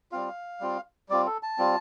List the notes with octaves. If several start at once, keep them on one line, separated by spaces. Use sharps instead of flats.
G3 C4 F4 F5
G3 C4 F4
G3 C4 F4 D5
A4
A5
G3 C4 F4